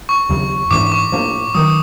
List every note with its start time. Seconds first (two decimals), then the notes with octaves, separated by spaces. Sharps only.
0.09 C#6
0.29 D#2 C#3 F#3
0.71 G#2 E3 A3 D4 D6
0.92 C#6
1.12 A2 F3 A#3 D4
1.54 D#3 F#3 D#6